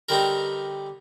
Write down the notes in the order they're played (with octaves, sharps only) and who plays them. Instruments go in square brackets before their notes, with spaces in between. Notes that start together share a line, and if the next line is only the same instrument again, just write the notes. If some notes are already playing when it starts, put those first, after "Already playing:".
[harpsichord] D3 G3 C4 D#4 A#4